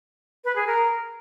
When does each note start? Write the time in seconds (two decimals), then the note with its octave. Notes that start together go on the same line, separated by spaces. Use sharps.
0.44 B4
0.55 G#4
0.66 A#4